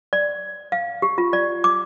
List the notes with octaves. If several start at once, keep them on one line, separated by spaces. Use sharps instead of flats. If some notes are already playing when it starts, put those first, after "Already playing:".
D5
F5
G4
F4
D5
D6